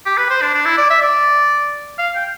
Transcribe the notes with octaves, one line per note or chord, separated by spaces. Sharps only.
G4
B4
C5
D4
D4
E4
D5
E5
D5
F5
G5